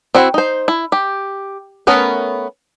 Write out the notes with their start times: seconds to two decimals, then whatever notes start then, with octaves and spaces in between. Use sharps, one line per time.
0.15 C4 E4 F#4
0.34 D#4 C5
0.68 E4
0.92 G4
1.87 A3 B3 C#4 A#4 B4